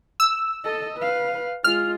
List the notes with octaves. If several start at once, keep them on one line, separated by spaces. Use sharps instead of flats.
E6
A4 D#5
B4 F5
G#3 F4 F6